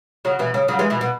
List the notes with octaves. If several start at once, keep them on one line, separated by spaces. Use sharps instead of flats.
C#3 F#3
B2 E3
C#3
C#3 F#3
E3 G#3
B2 E3
B2